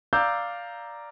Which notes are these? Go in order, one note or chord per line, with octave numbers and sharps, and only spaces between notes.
D5 F5 A#5 D6 E6 G6